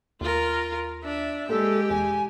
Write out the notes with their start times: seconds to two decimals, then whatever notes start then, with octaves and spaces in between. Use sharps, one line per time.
0.21 D#2 F4 A#4
1.03 D4 E5
1.49 A#2 G#3 G4 A4
1.90 E1 G#5